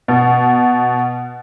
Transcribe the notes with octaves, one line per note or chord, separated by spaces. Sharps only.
B2